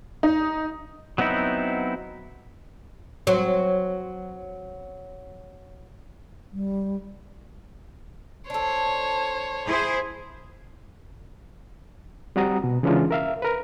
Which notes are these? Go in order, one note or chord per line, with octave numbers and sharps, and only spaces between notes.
D#4
F#3 B3 C4 D#4 E4
F#3 C4
G3
D4 A4 C5 C#5
E4 G#4 C5
G3 C4 F#4 F#5 A#5 D#6
B2
C#3 E3 G#3 C#4 D4 F4
A#4 E5 F5
A#4 B4